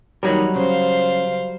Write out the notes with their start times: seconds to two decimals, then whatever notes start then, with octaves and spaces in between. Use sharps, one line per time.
0.23 D#2 F#3 G3 D#4 A#4
0.56 C#3 C5 F5